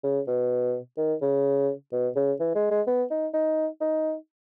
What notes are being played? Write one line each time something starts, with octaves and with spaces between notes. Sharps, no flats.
C#3
B2
D#3
C#3
B2
C#3
E3
G#3
G#3
B3
D#4
D#4
D#4